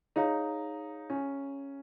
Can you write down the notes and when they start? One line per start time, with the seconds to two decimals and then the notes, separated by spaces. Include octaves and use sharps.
0.16 D#4 G#4 C#5 F5 A#5
1.10 C#4